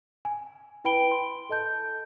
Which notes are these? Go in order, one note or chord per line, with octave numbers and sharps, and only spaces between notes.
G#5
E4 B4 G5 B5 D7 G7
C6
A4 D#5 A5 G6